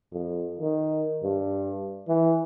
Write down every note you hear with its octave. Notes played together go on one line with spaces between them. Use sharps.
F2
D#3
G2
E3